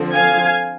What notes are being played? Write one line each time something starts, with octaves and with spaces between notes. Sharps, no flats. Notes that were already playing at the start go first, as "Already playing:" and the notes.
Already playing: D3 F3 C4
F5 G#5